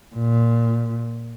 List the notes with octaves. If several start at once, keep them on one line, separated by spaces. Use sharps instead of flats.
A#2